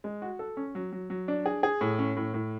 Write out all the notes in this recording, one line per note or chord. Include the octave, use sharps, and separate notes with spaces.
G#3
F#4
A4
C#4
F#3
F#3
F#3
D4
G#4
G#4
A2
C#4
A2
A2